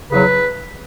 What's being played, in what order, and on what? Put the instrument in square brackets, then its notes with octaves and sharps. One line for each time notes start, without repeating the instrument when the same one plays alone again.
[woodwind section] E2 C#3 F#3 B4